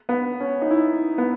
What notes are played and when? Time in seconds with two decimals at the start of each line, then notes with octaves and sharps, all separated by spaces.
0.09 B3
0.40 C#4
0.61 D#4
0.71 E4
1.18 B3